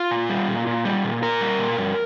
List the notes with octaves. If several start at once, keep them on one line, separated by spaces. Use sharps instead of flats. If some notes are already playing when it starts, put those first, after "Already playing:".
Already playing: F4
A#2
G3
A#2
A#2
G3
A#2
A#2 A#4
G3
A#2
G2